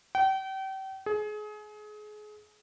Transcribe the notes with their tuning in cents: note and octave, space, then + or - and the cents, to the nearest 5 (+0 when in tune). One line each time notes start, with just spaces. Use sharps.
G5 -35
G#4 +30